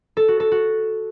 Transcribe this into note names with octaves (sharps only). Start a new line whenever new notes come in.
A4
F#4
A4
F#4